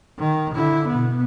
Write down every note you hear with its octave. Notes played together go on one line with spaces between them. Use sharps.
D#3
D3 E4
B2 B3